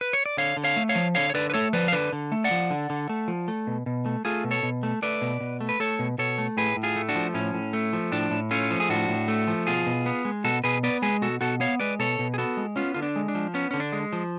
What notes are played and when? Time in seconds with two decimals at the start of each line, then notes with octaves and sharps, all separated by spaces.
0.01 B4
0.13 C#5
0.26 D5
0.37 D3 C#5 F5
0.57 D3
0.64 C#5 F5
0.76 A3
0.89 C#5 F5
0.95 F3
1.15 D3 C#5 F5
1.30 C#5
1.34 D3 B4 D5
1.50 B4
1.54 A3 A4 C#5
1.73 F3 B4 D5
1.88 F5
1.92 D3 B4 D5
2.13 D3
2.32 A3
2.44 D5 F#5
2.51 F3
2.70 D3
2.90 D3
3.09 A3
3.28 F3
3.48 A3
3.67 B2
3.86 B2
4.06 A3
4.25 A3 F4 G#4
4.44 B2
4.51 A4 C#5
4.63 B2
4.83 A3
5.02 A3 B4 D5
5.22 B2
5.41 B2
5.61 A3
5.69 B4
5.80 A3 A4 C#5
5.99 B2
6.18 B2 A4 C#5
6.38 A3
6.57 A2 G#4 B4
6.76 A2
6.83 F4 G#4
6.96 A3
7.09 D4 F#4
7.15 F3
7.34 A2 C#4
7.54 A2
7.73 A3
7.93 F3
8.12 A2 D4
8.31 A2
8.51 A3 C#4 F4
8.71 F3
8.80 G#4
8.89 A2 D4 F#4
9.09 A2
9.28 A3
9.47 F3
9.67 B2 F4 G#4
9.86 B2
10.06 B3
10.25 G#3
10.44 B2 F#4 A4
10.64 B2 G#4 B4
10.83 B3 B4 D5
11.02 G#3 G#4 B4
11.22 B2 F#4 A4
11.41 B2 F#4 A4
11.60 B3 C#5 F5
11.80 G#3 B4 D5
11.99 B2 A4 C#5
12.19 B2
12.34 G#4
12.38 B3 F#4 A4
12.57 G#3
12.76 B3 C#4 F4
12.94 D3 F4
13.03 D4
13.16 G#3
13.28 D4
13.35 F3
13.54 B3 C#4
13.71 D3 C#4
13.80 D4
13.93 G#3
14.13 F3